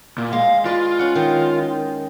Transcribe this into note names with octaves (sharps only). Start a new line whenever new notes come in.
A#2
G#3 F5
F4 B4 D5
C#4 F#5
D#3